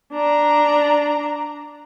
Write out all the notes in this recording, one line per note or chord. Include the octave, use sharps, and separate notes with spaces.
D4 A#5